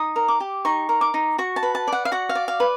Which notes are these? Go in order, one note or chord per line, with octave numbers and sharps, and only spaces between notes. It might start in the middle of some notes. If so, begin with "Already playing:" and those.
Already playing: D#4 D#6
A#4
D6
G4
D#4 C#6
A#4
D6
D#4
F#4 C#6
A5
B4
A5
D5
F#5
F5
F#4 F#5
F5
D5
F5
B4